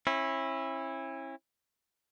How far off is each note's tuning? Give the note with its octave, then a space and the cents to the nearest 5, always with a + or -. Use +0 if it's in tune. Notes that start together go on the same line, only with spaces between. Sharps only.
C#4 -40 E4 +0